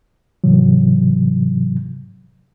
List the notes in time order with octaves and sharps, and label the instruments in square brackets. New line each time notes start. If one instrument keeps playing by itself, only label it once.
[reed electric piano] G#2 C3 E3 F#3